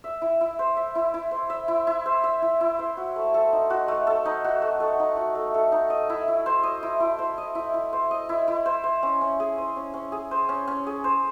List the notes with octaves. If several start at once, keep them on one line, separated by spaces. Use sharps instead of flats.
E5
E4
E4
C5
E5
E4
E4
C5
E5
E4
E4
C5
E5
E4
E4
C5
F#4
A3
A4
D#4
F#4
A3
A4
D#4
F#4
A3
A4
D#4
F#4
A3
A4
D#4
D#5
E4
E4
C5
D#5
E4
E4
C5
D#5
E4
E4
C5
D#5
E4
E4
C5
C5
C#4
C#4
G#4
C5
C#4
C#4
G#4
C5
C#4
C#4
G#4
C5